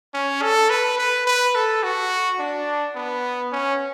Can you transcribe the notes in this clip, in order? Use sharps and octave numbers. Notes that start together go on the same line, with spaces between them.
C#4
A4
B4
B4
B4
A4
F#4
D4
B3
C#4